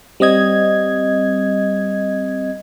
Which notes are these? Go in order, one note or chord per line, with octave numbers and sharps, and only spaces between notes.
G3 C4 D#5 G#6